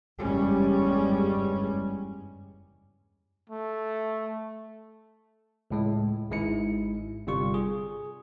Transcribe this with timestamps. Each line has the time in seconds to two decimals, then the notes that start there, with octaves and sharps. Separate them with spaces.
0.19 F#1 E2 G2 G3 G#3 C#4
3.50 A3
5.71 C#2 A2 G#3
6.31 G#1 G#2 G#3 E4 C#7
7.27 G1 C3 G3 F4 C#6
7.54 G#4